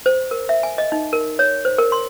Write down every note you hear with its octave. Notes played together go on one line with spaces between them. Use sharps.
C5
A#4
E5
G#5
D#5
D#4
A#4
C#5
C5
A#4
C6